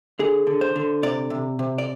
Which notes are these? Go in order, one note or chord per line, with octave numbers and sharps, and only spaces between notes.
D3 G#4
D3
C5
D3
C3 D5
C3
C3
D5